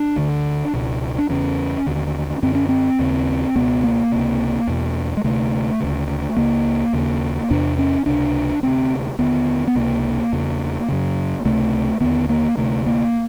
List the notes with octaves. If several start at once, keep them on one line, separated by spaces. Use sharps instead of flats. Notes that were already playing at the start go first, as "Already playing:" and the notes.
Already playing: D4
D2 D3
C#2 B2
D4
E2 C#3 C#4
D#2 D3
F#2 D3 C4
C#4
C4
D#2 C#3
C#2 B2 B3
A#3
C#2 C3
E2 B2
G#3
D2 C3 A3
D2 C#3
C#2 C#3 A#3
D#2 C#3
E2 C3 D4
C#4
C#2 C3 D4
D2 C3 C4
D#2 D3 B3
B3
C#2 C3 A#3
E2 C#3
F#2 C#3
C#2 C3 A3
D#2 D3 B3
A#3
D2 C3 A3
A#3